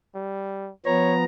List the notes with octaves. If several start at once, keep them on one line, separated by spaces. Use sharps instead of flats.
G3
F3 B3 C#5 A#5